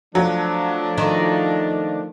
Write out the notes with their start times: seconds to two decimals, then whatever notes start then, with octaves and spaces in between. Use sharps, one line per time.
0.15 F3 F#3 A3 D4
0.98 D#3